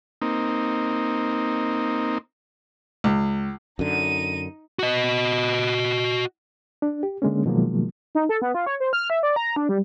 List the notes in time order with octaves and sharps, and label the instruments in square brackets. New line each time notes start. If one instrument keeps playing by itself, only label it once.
[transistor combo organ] A#3 C4 D#4
[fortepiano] C#2
[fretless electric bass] F#2 D3 [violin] D#4 D#7
[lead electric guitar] F#4 D#5
[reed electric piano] D4
G4
D3 G#3 A#3 C#4
B2 D#3 F3 F#3 G#3 A#3
[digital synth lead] D#4
A4
B3
F4
C#5
C5
F6
E5
D5
A#5
D4
G3